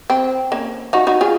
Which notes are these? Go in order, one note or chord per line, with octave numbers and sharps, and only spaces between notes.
C4
A#3 C#4
D#4 F#4
D#4 F#4
F4 G#4